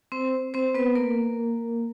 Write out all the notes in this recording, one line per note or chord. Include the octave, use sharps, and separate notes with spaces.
C4 C5
C4 C5
B3 B4
A#3 A#4